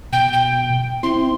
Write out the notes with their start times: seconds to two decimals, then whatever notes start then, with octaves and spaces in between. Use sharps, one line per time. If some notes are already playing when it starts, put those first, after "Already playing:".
0.13 B2 G5
0.33 G5
1.03 C4 E4 C6